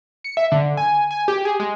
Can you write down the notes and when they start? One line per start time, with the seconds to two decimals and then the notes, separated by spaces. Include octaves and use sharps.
0.24 C#7
0.37 E5
0.52 D3
0.77 G#5
1.11 G#5
1.28 G4
1.45 G#4
1.60 G#3